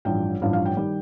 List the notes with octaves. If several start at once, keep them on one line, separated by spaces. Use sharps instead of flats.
A1 G2 F3 G5
A1 G2 F3 F5
F5
G5
D#3 G3